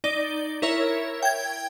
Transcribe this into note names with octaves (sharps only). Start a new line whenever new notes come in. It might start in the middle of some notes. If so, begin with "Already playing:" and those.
D#4 D5 G7
E4 A#4 C#5 E5
G5 G#6